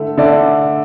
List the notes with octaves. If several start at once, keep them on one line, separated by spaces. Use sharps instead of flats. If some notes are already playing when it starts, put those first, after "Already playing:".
Already playing: D3 A3 E4 A4
D3 A3 E4 A4 D5